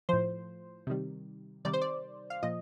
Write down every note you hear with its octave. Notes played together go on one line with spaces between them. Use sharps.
A2 F3 C5
C3 D#3 G3
C3 D#3 G3 D5
C5
D5
F5
A#2 F3 D#5